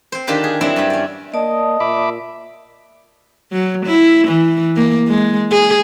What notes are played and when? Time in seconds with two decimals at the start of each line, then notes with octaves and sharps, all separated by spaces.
0.12 C4 C5
0.27 D3 D#3 D4 F4 G4 B4
0.44 G#4
0.61 F#3 G3 C4 D4 E4
0.76 G2 G4
0.90 C#4 D5
1.34 A#3 D5 D#5 A5 D#6
1.80 A#2 E5 B5 D6
3.52 F#3
3.86 E4
4.28 E3
4.76 A#3
5.08 G#3
5.51 G#4